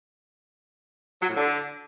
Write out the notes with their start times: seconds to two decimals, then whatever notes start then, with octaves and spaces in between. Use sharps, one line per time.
1.22 F#3
1.29 A2
1.37 D3